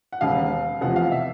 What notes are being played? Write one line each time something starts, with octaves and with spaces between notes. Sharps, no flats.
F#5
E1 D#2 C#3 F5
F1 E2 C3 F3 F#5
F5
E5